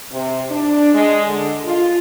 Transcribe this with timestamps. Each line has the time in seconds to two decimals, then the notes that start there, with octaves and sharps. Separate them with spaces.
0.11 C3
0.50 D4
0.93 G#3
1.26 D3
1.65 F4